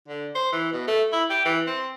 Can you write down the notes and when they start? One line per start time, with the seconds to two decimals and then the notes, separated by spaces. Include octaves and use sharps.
0.08 D3
0.35 C5
0.52 E3
0.72 B2
0.87 A3
1.12 E4
1.30 G4
1.45 E3
1.67 C4